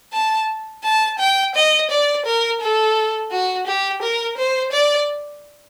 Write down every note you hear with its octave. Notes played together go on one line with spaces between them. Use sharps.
A5
A5
G5
D#5
D5
A#4
A4
F#4
G4
A#4
C5
D5